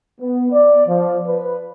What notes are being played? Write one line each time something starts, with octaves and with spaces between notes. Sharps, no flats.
B3
D5
F3
B4